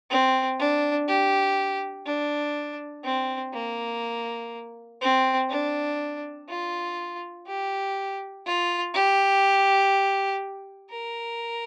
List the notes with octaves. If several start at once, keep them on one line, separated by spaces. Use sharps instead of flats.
C4
D4
G4
D4
C4
A#3
C4
D4
F4
G4
F4
G4
A#4